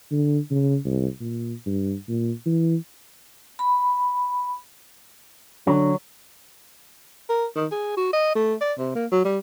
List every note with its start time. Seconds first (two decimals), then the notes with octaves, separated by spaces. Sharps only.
0.11 D3
0.50 C#3
0.85 C2
1.20 A#2
1.66 G2
2.08 A#2
2.46 E3
3.59 B5
5.67 D3 F#3
7.29 A#4
7.56 D#3
7.72 G#4
7.97 F#4
8.13 D#5
8.36 A3
8.61 D5
8.78 C3
8.96 A#3
9.12 F#3
9.25 G3